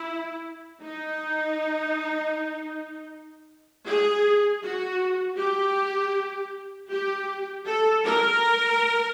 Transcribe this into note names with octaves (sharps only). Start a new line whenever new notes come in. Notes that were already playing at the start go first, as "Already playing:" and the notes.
Already playing: E4
D#4
G#4
F#4
G4
G4
A4
A#4